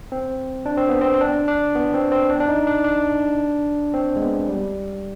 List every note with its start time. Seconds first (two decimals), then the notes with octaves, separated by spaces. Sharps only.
0.12 C4
0.66 D4
0.78 C4
0.89 B3
1.02 C4
1.14 C4
1.21 D4
1.48 D4
1.75 B3
1.94 C4
2.12 C4
2.30 D4
2.40 D4
2.48 D#4
2.67 D4
2.84 D4
3.94 C4
4.16 G#3
4.21 B3
4.49 G3